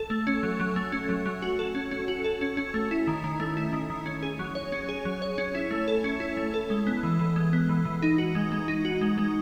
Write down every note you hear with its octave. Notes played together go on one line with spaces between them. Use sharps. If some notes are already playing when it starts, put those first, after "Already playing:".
Already playing: A4
A3
C#4
F#3
F#3
A3
C#4
F#3
F#3
F#4
A4
C#4
C#4
F#4
A4
C#4
C#4
A3
E4
D#3
D#3
A3
E4
D#3
D#3
C#4
G#4
F#3
C#5
C#4
G#4
F#3
C#5
C#4
E4
A3
A4
C#4
E4
A3
A4
G#3
B3
E3
E3
G#3
B3
E3
E3
D#4
F#4
G#3
G#3
D#4
F#4
G#3
G#3